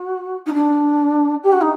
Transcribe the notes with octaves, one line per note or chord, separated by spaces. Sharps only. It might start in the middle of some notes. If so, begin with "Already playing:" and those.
Already playing: F#4
D#4
D4
G4
F#4
D#4